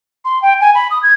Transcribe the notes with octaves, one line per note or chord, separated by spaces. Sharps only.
C6
G5
G#5
B5
D#6
G#6